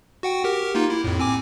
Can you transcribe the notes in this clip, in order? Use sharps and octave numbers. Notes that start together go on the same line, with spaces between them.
F#4 F#5 G5
G4 A#4
A#3 D#4 F4
E4
F2 A2
C4 G#5 D6